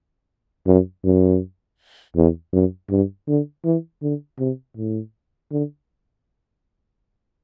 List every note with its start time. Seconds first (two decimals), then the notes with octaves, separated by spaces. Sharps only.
0.67 F#2
1.05 F#2
2.16 E2
2.53 F#2
2.90 G2
3.28 D3
3.65 E3
4.02 D3
4.39 C3
4.77 A2
5.51 D3